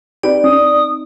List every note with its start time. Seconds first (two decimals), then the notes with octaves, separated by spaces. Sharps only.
0.23 C4 D#4 G4 B4 D5
0.44 C#4 D#6